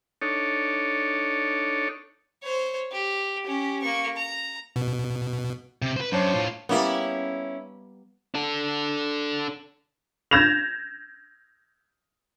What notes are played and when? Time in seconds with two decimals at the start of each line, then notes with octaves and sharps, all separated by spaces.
0.22 D4 D#4 A4 C#5
2.43 C5 C#5
2.92 G4
3.45 C#4 G4
3.82 A#3 C#6
4.16 A#5
4.76 B2
5.82 C3
5.97 B4 C5
6.12 F#2 D4 C5 C#5
6.34 A2 F4
6.69 G3 A#3 B3 C#4 E4
8.34 D4 A4
10.31 G6 G#6 A#6 E7 F7